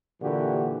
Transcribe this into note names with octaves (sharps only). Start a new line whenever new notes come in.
A#2 D3 E3 F#4 G4